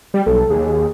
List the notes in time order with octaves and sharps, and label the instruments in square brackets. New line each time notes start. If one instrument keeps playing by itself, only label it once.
[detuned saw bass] G3
[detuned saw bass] B1 [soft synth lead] A4
[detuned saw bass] D#2 [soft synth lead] G#4